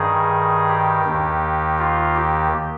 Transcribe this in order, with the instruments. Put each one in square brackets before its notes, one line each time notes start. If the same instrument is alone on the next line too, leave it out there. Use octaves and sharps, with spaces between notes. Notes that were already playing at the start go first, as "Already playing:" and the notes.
Already playing: [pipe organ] G2 D#3 G#4
G4
D#2 D#3
F4
G4